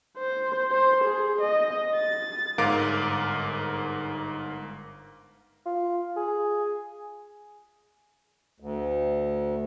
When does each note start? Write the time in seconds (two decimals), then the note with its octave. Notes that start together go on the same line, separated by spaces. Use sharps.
0.18 C5
0.71 C5
1.04 G#4
1.41 D#5
1.96 A6
2.58 G1 G#2 A#4 F5 D6 D7
5.66 F4
6.17 G#4
8.60 D2